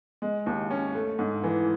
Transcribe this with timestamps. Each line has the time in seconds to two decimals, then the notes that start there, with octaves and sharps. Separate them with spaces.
0.22 G#3
0.46 D#2
0.71 C#4
0.95 A3
1.19 G#2
1.43 E3